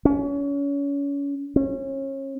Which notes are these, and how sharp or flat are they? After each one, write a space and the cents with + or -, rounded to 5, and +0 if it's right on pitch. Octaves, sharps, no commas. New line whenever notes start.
C#4 +30
C#4 -30